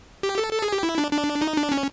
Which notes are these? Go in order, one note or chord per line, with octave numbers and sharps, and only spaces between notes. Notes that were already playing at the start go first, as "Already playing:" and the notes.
G4
A4
A4
G#4
G4
E4
D4
D4
D#4
D4
C#4